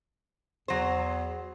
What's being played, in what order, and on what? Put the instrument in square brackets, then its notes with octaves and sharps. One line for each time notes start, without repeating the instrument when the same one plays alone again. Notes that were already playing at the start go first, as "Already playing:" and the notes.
[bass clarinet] E2 [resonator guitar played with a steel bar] F#3 C5